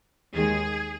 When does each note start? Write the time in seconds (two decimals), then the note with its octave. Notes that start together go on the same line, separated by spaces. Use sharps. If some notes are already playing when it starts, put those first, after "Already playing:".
0.35 D#2 D#3 G#3 G#4